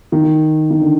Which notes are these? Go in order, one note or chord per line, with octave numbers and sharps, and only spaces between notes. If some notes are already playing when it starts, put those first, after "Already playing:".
D#3
D#3
D3